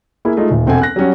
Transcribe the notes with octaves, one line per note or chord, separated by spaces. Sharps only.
A#3 E4 G#4 A#4
G#3 A3 D#4 F4
D#1
E1 C4 A4 F#5 G#5
F#6 A#6
F#3 G3 C#4 F#4